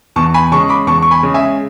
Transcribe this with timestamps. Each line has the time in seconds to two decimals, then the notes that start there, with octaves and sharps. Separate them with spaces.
0.16 E2 A5 C#6
0.34 G#5 B5
0.52 C#3 G#3 A5 C#6
0.69 B5 D6
0.87 E2 A5 C#6
1.02 C#6
1.11 G#5 B5
1.23 C#3 G#3
1.34 E5 G#5